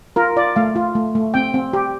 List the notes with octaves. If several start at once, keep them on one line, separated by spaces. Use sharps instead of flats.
F4 A#4
F4 D5
A3 F5
F4
A3
A3
C4 G5
C4
G4